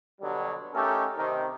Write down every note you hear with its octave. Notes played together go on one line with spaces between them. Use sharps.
B2 D3 F#3 G3
A3 C#4 D#4 G4 A4 A#4
C3 D#3